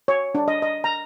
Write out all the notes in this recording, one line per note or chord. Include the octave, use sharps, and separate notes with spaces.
C#5
D4
D#5
D#5
A#5